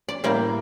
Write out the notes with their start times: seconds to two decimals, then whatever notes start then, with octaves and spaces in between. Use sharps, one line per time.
0.09 D5
0.24 A2 G3 A#3 D5